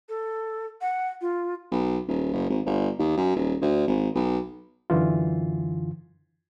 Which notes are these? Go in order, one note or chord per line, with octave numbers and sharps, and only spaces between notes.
A4
F#5
F4
B1
D#1
F#1
G#1
G1
D#2
F#2
D#1
D2
G#1
B1
F#2 D3 E3 F4